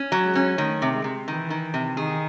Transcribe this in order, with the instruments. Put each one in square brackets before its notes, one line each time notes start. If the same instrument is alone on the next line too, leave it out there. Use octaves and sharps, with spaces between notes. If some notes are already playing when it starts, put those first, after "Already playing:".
Already playing: [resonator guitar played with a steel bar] C#4
F#3
[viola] G#3
[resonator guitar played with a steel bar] C#4
[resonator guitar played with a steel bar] D#3 [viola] A3
[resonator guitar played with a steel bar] C3
[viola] G#3
[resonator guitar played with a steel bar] C3
[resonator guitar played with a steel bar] D#3 [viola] E3
[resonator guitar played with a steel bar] D#3
C3
[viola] D#3 [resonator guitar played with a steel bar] G#4